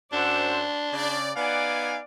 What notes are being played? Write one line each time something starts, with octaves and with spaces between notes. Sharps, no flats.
F#2 D4 C5 F#5 D6 E6
C6
C#3 D5
B3 D#4 D5 F5 F#5 G#5 D6